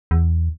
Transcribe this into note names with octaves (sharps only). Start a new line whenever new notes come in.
E2